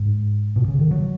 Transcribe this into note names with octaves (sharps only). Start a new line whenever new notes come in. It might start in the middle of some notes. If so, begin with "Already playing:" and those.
Already playing: G#2
B2
C#3
D#3
F#3